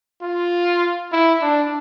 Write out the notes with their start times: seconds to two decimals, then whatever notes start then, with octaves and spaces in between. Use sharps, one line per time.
0.22 F4
1.12 E4
1.42 D4